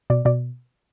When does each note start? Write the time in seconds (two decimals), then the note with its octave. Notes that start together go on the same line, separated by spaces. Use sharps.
0.10 B2 D5
0.25 B2 D5